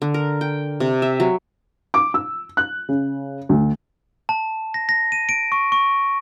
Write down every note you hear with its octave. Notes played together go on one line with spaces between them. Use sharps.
D3
A#4
G5
C3
E5
F#3
D6
E6
F#6
C#3
D2
A5
A#6
A#6
D#7
D7
C#6
C#6